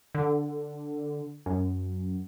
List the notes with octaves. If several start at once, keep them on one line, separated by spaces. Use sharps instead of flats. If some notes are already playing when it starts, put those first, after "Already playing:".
D3
F#2